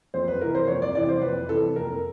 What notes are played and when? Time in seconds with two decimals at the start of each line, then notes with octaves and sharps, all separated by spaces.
0.14 F2 C5
0.28 B4
0.41 C3 E3 A#4
0.55 C5
0.68 F2 C#5
0.82 D5
0.95 C3 E3 D5
1.09 C5
1.22 F2 B4
1.48 C3 E3 A4
1.76 F2 A#4